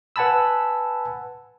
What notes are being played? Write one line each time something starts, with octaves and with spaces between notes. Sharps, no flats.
B4 F#5 G#5 A5 B5 E6